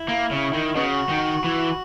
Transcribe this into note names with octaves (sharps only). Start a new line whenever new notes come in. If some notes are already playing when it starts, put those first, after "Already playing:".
Already playing: E4
A#3
C#3
D#3
E4
C#3 B3 D#4 F#4
D#3
E3